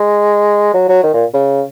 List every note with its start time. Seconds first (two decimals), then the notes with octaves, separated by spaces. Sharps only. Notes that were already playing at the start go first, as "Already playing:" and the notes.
Already playing: G#3
0.74 F#3
0.89 F#3
1.03 D#3
1.14 A#2
1.33 C#3